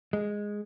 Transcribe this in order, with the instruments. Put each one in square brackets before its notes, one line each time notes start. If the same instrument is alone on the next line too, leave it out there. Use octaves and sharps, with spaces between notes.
[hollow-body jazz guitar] G#3